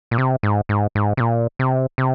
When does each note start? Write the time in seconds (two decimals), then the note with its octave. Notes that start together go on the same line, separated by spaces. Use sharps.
0.11 A#2
0.18 C3
0.43 G#2
0.69 G#2
0.95 G#2
1.17 C3
1.20 A#2
1.59 C3
1.98 C3